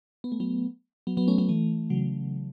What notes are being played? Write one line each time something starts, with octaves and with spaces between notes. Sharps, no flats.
B3
A3
F#3 B3
F#3 B3
F#3 B3
A3 C#4
F#3 B3
E3 A3
C#3 F#3